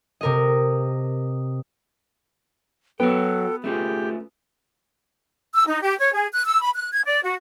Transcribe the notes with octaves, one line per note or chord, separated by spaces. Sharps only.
C3 A#4 D#5
F#3 B3 F#4 A4 G5
A3 C#4 F4 G4 G#4
E6
D#4
G4
C#5
G#4
F#6
E6
B5
F#6
G#6
D5
F#4